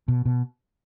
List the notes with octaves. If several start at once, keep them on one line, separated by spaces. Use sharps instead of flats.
B2
B2